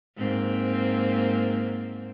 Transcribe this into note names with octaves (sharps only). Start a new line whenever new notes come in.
G#2 A#3 C4